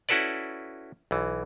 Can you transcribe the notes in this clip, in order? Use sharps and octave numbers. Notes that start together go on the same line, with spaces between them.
C#4 E4 F#4 A4 B4 D5
B1 E3